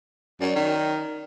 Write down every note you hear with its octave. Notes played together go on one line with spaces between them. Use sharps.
F#2 C#5 D5
D#3